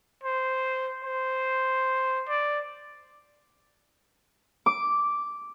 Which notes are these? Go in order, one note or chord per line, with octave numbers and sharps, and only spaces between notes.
C5
C5
D5
D6